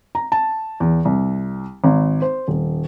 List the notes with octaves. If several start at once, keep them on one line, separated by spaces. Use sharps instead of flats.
A#5
A5
E2
C2
G#1
C5
D#1